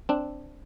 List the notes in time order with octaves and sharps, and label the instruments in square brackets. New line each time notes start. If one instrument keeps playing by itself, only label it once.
[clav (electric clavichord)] C4 D4